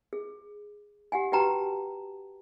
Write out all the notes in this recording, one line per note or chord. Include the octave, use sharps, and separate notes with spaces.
G#4
G4 F#5 G#5
F#4 G4 B4 G5 A5 A#5